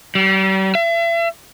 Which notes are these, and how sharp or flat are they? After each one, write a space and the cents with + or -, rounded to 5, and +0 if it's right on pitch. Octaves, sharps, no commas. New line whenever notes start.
G3 -40
E5 +40